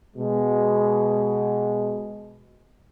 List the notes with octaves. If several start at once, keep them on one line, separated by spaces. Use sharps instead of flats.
B2 G#3